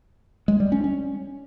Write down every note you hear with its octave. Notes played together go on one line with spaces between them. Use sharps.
G#3
G3
C#4
C#4